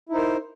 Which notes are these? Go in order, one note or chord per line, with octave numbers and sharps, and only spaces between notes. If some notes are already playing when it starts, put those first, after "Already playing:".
D#4 E4 A#4 C5